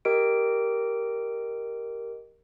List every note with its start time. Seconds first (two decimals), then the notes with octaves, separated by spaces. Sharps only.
0.05 G4 A#4 D#5 D7